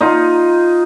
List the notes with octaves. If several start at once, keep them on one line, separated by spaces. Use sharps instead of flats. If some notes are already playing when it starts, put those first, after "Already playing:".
D#4 F4